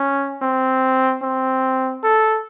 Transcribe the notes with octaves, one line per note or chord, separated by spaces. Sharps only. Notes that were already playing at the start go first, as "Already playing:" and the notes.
Already playing: C#4
C4
C4
A4